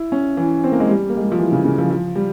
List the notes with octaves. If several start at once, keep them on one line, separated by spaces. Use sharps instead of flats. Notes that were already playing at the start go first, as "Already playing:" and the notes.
Already playing: E4
C#4
E3
C4
A#3
G#3
G3
A#3
G#3
G3
F3
E3
C#3
C#3
F3
F3
G3